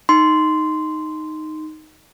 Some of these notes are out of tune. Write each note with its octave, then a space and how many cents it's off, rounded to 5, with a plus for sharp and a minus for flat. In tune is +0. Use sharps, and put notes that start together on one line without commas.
D#4 +0 C6 -10